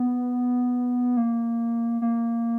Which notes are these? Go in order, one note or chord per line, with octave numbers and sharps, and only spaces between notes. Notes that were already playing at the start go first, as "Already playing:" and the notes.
Already playing: B3
A#3
A#3